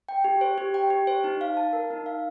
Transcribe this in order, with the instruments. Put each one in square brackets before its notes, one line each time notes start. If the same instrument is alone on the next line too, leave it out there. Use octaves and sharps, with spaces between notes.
[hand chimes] G5
G4
C5
G4
G5
G4
C5
D#4
F5
A5
A#4
D#4
F5